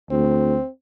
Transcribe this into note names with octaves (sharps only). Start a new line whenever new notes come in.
D2 C4